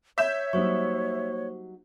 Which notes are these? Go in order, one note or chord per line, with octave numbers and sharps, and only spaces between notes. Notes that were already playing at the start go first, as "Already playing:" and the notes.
C#5 E5 G6 E7
F#3 G3 A#3 D#4 C5 C#6